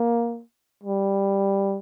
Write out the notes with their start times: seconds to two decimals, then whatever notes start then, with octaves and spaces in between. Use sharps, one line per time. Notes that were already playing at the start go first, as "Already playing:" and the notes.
Already playing: A#3
0.83 G3